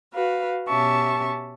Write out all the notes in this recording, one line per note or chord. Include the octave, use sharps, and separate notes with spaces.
F#4 B4 F5
B2 C#4 G4 E5 A5 C#6